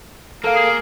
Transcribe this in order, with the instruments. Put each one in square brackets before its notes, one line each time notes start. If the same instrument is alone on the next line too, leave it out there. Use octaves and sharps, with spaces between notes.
[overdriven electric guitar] A#3 [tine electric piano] A4 A#4 F5
[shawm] G#4